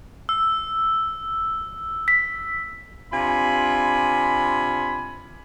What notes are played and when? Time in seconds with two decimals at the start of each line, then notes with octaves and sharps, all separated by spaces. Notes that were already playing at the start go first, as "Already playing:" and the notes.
0.29 E6
2.08 B6
3.12 C3 D4 F4 G#5 B5